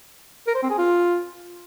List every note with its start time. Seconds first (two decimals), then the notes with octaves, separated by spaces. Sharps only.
0.47 A#4
0.55 C5
0.63 C4
0.70 G#4
0.78 F4